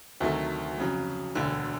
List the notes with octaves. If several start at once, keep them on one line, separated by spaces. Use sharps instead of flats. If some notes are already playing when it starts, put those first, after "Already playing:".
D2 C3 D#3 F#3 A3
F2 C#3 F#3
E1 D2 D3